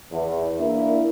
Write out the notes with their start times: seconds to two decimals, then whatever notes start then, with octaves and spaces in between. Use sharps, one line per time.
0.12 E2
0.59 A#3 D4 E4